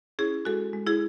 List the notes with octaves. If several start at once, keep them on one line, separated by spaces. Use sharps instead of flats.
C#4 E4 G#4
G#3 F#4 A4
G#3
E4 G#4